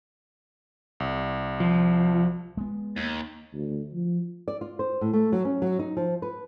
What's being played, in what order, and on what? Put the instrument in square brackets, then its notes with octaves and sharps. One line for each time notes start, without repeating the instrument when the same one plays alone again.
[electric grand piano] C2
[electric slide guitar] F3
[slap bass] G#3 B3
[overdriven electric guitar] D#2
[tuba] D2
F3
[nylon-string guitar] D5
F4
C5
A2
A3
F#3
C#4
F#3
D#4
F3
B4